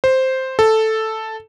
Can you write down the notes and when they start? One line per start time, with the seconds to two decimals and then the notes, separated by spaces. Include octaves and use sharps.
0.04 C5
0.59 A4